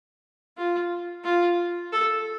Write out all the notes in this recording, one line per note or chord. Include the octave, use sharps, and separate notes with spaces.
F4
F4
A4